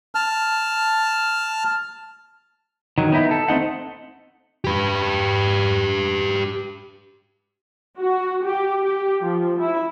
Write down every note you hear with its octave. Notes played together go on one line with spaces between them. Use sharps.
A5 F6
D#3 F#3
B3 D#4 E4
A4
A3 C4 D#4 F#5
G4 B4
F#4
G4
G4
F3
E4